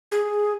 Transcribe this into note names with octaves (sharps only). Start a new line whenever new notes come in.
G#4